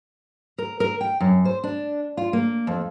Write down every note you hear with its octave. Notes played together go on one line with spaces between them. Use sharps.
A#4
A#4
G5
F#2
C5
D4
F4
A#3
F2